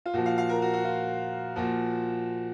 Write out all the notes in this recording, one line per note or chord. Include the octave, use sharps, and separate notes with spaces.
F4
A#2 F3 F#4
F5
F5
A#4
F#4
F#4
F4
A#2 F3 F#4